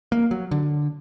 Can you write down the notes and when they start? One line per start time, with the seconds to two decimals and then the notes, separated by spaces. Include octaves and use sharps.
0.12 A#3
0.31 F#3
0.51 D3